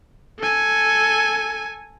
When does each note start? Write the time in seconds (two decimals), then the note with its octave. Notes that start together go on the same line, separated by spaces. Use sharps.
0.39 A4 G#5